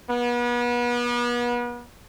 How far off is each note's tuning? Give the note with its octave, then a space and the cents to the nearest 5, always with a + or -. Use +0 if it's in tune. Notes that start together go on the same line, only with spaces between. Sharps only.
B3 -35